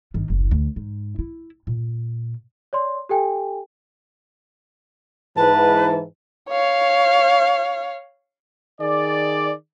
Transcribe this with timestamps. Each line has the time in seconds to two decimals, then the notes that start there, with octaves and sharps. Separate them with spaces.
0.14 G1 D#3
0.30 F#1 C2
0.51 D2
0.76 G#2
1.19 E4
1.67 A#2
2.73 C#5 D5 C6
3.09 G4 A4 G5 G#5
5.37 G#2 E3 B4 A5
6.49 C#5 F5
8.81 D#3 G#4 D5